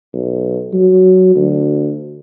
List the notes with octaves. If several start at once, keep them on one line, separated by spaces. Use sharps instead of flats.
B1
F#3
D2